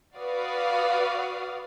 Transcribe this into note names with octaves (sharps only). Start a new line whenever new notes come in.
F#4 B4 D5 F5 D#6